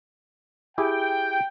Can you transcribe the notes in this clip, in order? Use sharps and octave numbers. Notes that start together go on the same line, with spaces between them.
E4 G4 G#4 G5